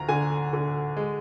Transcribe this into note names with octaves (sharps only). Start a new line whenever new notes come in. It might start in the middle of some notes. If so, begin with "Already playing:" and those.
Already playing: D2 A#5
D3 G#5
D3
G#3